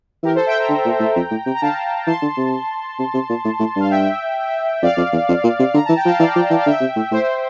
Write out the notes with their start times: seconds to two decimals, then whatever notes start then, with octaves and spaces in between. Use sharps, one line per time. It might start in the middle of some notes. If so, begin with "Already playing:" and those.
0.23 E3 G4 A#4
0.35 A4 C5
0.46 E5 G5
0.58 G5 A#5
0.69 D3
0.85 A#2
1.00 A2
1.16 F2
1.31 A2
1.46 C3
1.54 A#5
1.61 D3 F5 A5
2.07 E3 A5 C6
2.22 D3
2.37 C3
2.99 C3
3.14 C3
3.30 A#2
3.45 A2
3.60 A2
3.76 G2 F5
3.90 E5 G5
4.82 F2 D5 F5
4.97 F2
5.12 E2
5.29 F2
5.44 A#2
5.59 C3
5.74 D3 A#5
5.85 E3 A5
5.96 G5
6.05 F3 F5 A5
6.20 E3 D5 F5
6.36 F3
6.50 E3
6.59 F5
6.66 D3 E5 G5
6.81 C3
6.96 A2
7.11 A2 C5 E5